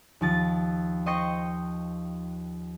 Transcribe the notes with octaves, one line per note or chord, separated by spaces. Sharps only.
D#2 F3 A6
C5 D#5 G5 C#6 A#6